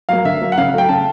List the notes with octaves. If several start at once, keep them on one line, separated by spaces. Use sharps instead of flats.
F#3 A#3 F5
D3 E5
F#3 A#3
F#5
C#3 F5
F#3 A3 G5
C#3 A5